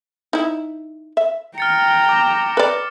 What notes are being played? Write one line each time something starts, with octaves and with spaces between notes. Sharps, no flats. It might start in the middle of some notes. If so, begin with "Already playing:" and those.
D#4 E4
E5
G5 A#5 F6 A6 C#7
D6
B4 D5